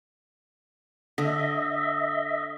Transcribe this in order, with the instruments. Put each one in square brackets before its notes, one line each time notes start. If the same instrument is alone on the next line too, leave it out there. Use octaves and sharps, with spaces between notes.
[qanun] D3 [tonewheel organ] D#5 E5